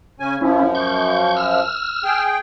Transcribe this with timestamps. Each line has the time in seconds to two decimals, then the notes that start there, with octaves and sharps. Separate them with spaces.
0.20 C#3 C#4 G#5
0.41 F#2 F3 C#4 E4
0.75 C#6 G6
1.36 E6 F6
2.04 G#4 G5